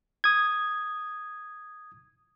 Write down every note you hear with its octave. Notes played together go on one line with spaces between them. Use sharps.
D#6 G#6